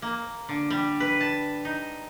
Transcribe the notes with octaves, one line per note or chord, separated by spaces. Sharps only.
A#3
D3
G3
B4
A5
D#4